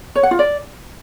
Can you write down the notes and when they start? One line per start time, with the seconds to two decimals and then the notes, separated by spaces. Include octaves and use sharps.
0.16 C#5
0.23 F#5
0.31 F4
0.39 D5